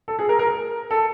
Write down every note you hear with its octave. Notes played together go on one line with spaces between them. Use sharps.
A4
G#4
A#4
A#4
A4